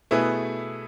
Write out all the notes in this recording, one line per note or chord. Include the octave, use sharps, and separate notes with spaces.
B2 A3 E4 G#4 B4